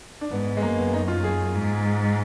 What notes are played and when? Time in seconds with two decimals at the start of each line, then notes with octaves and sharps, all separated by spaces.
0.21 D4
0.31 G#2 B3
0.57 G#3
0.62 F#2 A#3
0.78 B3
0.93 D#4
1.08 F4
1.24 G#4
1.55 G#2